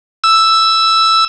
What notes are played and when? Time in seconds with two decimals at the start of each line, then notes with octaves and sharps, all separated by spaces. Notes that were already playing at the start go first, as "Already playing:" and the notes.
0.24 E6